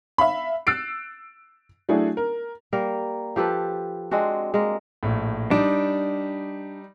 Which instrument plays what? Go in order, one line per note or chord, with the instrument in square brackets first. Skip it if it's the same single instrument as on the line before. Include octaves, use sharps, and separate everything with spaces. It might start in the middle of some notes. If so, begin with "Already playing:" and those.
[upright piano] E5 F5 B5
E6 F#6 A6 C7 D7
F#3 A3 D4 E4 F#4 G#4
A#4
[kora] G3 A#3 A#4
F3 G4 A4 B4
G#3 C4 D4 F#4
G#3 A#3 A#4
[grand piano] A#1 A2
[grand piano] G3 D#4 [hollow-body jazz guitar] D4